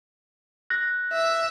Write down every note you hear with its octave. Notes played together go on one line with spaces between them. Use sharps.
F#6 A#6
E5